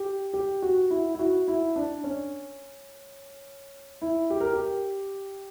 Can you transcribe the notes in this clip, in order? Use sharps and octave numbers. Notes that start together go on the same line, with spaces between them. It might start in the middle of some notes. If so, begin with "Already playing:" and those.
Already playing: G4
G4
F#4
E4
E4
F#4
E4
D4
C#4
E4
G4
A#4
G4